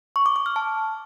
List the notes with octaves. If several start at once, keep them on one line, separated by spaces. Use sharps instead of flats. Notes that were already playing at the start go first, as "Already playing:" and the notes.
C#6
D6
D6
F6
A5